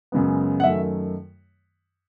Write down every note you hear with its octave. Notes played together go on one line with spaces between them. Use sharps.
F#2 C#3 G#3 B3
F#5
F#2 D#3 A3 E5